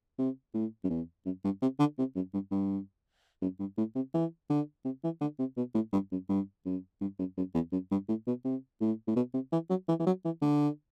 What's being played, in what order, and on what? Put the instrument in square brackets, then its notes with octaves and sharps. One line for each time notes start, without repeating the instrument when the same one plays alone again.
[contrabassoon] C3
A2
F#2
E2
F#2
G2
C3
D3
C3
F#2
G2
G2
F#2
G2
A2
C3
E3
D3
C3
E3
D3
C3
B2
A2
G2
F#2
G2
F#2
G2
F#2
F#2
E2
F#2
G2
A2
B2
C3
A2
A2
B2
C3
E3
F#3
E3
E3
F#3
E3
D3